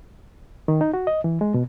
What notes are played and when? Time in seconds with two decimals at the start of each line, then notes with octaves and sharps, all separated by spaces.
0.68 D#3
0.81 D#4
0.94 F#4
1.07 D#5
1.24 E3
1.41 G#3
1.54 B2